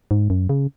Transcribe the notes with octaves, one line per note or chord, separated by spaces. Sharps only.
G#2
F#2
C#3